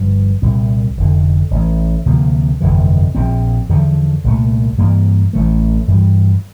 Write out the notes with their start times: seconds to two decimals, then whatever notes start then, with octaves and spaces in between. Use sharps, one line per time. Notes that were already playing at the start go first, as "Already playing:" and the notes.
Already playing: G1 G2 F3
0.42 C2 A#2 G3 C4
0.97 F1 F2 D3
1.51 A1 A2 E3
2.06 D2 C3 F3 A#3
2.61 G1 F2 C3 E3
3.15 A#1 A#2 F3 C4
3.69 E2 D3 F3
4.24 C2 A#2 A3
4.78 G2 E3 A#3
5.33 A1 A2 E3 A3
5.88 G2 E3 G3